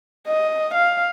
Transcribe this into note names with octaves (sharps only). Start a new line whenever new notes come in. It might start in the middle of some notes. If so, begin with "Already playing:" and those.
D#5
F5